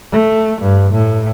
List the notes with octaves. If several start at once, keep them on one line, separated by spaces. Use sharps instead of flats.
A3
G2
A2